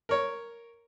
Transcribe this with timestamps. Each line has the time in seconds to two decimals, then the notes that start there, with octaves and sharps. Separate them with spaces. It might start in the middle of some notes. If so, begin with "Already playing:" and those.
0.09 A#4 C#5